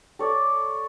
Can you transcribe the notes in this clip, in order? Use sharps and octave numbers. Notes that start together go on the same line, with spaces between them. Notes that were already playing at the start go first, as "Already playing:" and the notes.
A4 C#5 D5